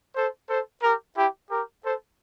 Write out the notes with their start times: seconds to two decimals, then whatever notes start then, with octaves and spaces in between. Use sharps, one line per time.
0.15 A4 C5
0.48 A4 C5
0.82 G4 A#4
1.15 E4 G4
1.49 G4 A#4
1.83 A4 C5